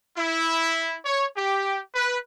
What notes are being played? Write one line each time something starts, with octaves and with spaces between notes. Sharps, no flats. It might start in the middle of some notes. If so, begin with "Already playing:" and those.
E4
C#5
G4
B4